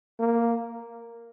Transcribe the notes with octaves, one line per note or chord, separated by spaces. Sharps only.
A#3